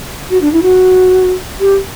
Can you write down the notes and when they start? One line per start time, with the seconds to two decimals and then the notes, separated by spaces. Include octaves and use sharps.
0.30 F#4
0.42 D4
0.53 E4
0.62 F#4
1.60 G4